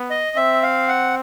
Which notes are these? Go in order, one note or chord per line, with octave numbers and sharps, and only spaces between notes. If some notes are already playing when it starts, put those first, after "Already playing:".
Already playing: B3
D#5
C4 E5
F5
F#5